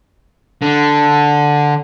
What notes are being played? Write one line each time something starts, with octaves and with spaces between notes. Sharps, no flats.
D3